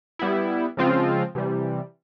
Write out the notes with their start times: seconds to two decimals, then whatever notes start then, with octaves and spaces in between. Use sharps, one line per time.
0.19 G3 B3 E4
0.77 C#3 F3 G#3 C4 F4
1.35 C3 E3 G3